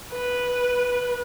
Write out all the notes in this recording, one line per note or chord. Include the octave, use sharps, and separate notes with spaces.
B4